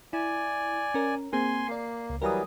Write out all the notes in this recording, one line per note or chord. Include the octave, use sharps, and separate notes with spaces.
E4 D5 G#5
C#4 A#4
A#3 C4 G#4 G#5 C6
A#3 D5 C7
C#2
E3 F#3 G3 A#4 A#5 D#6